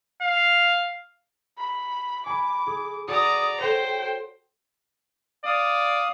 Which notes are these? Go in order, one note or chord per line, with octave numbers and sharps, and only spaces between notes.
F5
B5
G#5 B5 D6
G#4
F#4 D5 A#5 D#6
A4 C5 C#5 G5
D5 F5 D#6